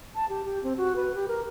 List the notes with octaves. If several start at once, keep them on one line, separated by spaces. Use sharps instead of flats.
A5
G4
G4
C4
F#4
B4
G4
A#4